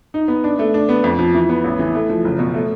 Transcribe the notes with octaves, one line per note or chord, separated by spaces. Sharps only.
D#4
B3
D4
A3
D4
B3
F2
F3
E3
B3
A1
E3
A3
F3
F#1
B2
A3